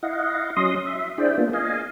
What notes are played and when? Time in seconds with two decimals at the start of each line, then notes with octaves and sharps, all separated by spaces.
0.03 E4 D#5 F5 F#5
0.56 F#3 C#4 D#5 C6 D#6
0.86 E5
1.18 D4 E4 G#4 C5 D5 G5
1.38 A#3 B3 D4 F4
1.53 D#5 F5 G#5